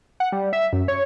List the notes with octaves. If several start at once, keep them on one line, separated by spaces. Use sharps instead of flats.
F#5
G3
E5
F#2
C#5